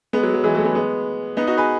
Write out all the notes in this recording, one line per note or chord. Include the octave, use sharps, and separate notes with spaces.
G#3 B3
F#3
F#3
E3 G#3
F#3 A3
G#3 B3
G#3 B3
B3 D#4
D#4 F#4
G#4 B4